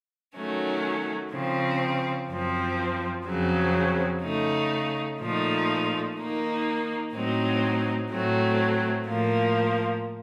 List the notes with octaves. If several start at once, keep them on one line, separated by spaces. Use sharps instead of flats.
D#3 F#3 A3 C#4
C#3 F3 C4
F#2 F3 C4
F2 C#3 F#3 C4
C#3 A3 D#4
A#2 F3 A3 D#4
D#3 A#3 D#4
A2 F#3 C4 D#4
A2 F#3 A3 C4
A2 F3 A#3